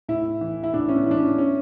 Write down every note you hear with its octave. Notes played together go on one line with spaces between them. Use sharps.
A2 E4
E3
E4
A2 D4
C#4
B3
E3 D4
C#4
C#4